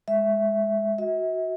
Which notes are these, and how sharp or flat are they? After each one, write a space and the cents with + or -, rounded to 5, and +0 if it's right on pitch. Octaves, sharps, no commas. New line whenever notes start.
G#3 +0 E5 +0
F#4 +0 E5 -45